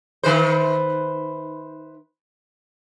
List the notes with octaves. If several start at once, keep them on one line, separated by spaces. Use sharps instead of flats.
D#3 B4 C5